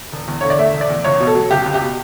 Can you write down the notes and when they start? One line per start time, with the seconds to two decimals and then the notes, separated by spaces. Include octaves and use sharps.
0.12 E1
0.28 E2
0.41 D3 C#5
0.50 D5
0.59 A3 E5
0.74 E1
0.81 D5
0.90 E2
1.05 C#2 C#5
1.20 B2
1.27 A4
1.35 F#3
1.51 C#2 G4
1.66 C#2
1.74 G4
1.82 B2